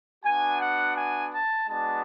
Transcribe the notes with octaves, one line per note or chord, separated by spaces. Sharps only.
B3 D4 F#4 G#5
F#5
G#5
A5
G#3 B3 D4 F#4 A5